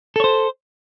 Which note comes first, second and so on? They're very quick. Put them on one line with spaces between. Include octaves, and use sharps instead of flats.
A4 C#5 C5